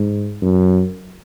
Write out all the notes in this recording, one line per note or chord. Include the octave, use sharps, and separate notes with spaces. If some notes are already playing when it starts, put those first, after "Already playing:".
Already playing: G#2
F#2